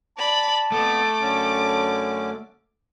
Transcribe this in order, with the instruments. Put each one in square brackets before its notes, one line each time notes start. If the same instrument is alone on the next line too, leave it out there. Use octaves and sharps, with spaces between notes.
[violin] D5 B5 [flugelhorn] A5
[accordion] F2 B3 [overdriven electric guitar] A3 [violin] D6
[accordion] F#2 D3 C#4